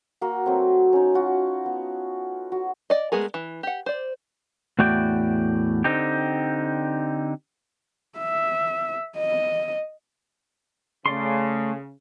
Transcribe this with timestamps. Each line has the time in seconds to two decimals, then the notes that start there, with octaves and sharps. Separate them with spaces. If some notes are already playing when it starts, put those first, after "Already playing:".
0.21 A#3 F#4
0.46 F#3 A3 C4
0.93 C#4 D#4
1.14 F4 F#4
1.66 B3
2.52 F#4
2.90 D5 D#5
3.12 G#3 A3 B3 G#4 A#4
3.34 E3
3.63 G4 F#5
3.86 C5 D5
4.79 E2 A2 A3 F#4 D5 G5
5.84 D3 C4 D#4 G4
8.19 E5
9.18 D#5
11.06 C#3 A3 D5 C6